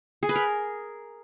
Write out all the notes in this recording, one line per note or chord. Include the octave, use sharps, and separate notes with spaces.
G#4
B4
A#4